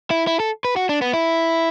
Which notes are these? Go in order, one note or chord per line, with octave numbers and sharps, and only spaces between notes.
E4
E4
A4
B4
F#4
D4
B3
E4